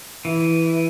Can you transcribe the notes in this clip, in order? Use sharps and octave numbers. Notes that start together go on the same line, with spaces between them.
E3